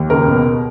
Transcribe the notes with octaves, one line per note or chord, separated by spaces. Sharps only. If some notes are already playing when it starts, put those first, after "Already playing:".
Already playing: D#2
C#2 A#4
B2